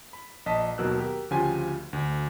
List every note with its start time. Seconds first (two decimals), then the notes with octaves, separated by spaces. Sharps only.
0.13 B5
0.46 A#1 D#5 A5 B6
0.78 D#2 B2 F#3 A#4 E6 F#6
0.98 G4 A#4
1.31 D2 C#3 F3 F4 G4 G#5
1.93 D2